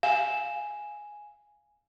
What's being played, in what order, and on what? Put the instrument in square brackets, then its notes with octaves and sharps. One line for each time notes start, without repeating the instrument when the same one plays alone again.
[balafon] F5 [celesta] G#5 E7